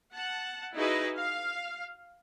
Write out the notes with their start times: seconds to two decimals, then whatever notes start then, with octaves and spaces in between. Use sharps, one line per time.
0.15 F#5 A5
0.76 D#4 E4 F#4 G#4 B4 D#5
1.19 F5